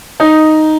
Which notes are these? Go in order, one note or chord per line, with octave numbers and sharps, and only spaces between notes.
D#4